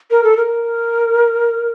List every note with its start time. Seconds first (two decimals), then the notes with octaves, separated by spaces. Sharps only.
0.11 A#4
0.24 A4
0.37 A#4